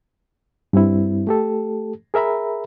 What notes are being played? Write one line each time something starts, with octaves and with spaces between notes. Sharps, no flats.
G2 G3 C4 E4
A3 G4 A4
G#4 A#4 E5 A#5 B5